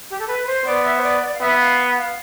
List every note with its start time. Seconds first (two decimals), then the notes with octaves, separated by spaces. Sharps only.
0.10 G4
0.19 A4
0.28 B4
0.47 C5
0.66 B3 D5
0.84 E5
0.97 C5
1.03 D5
1.22 D5
1.34 F5
1.40 B3 E5
1.59 F5
1.98 F5